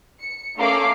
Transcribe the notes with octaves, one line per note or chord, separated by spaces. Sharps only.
C#7
A3 A#3 C#4 A#4 D6 C7